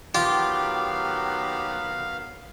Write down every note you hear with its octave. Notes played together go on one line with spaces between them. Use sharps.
D#3 F#3 B3 F4 G4 F5